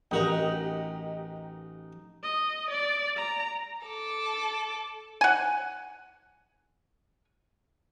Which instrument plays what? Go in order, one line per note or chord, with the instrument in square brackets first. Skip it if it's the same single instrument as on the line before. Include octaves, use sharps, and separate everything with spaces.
[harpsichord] A1 F#4 A#5 [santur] D#4 [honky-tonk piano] G4 A#4 D#5
[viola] D#5
D5
A#5
[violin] A4 D6
[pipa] F#5 G#5